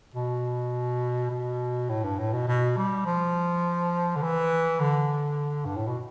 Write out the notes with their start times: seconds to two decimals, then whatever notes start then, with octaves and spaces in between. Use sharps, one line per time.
0.14 B2
1.31 B2
1.89 A2
2.04 G2
2.18 A2
2.33 B2
2.47 B2
2.77 G3
3.06 F3
4.16 D3
4.22 E3
4.80 D3
5.65 G2
5.76 A2
5.87 B2